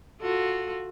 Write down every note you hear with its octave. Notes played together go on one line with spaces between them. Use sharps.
F4 F#4 A4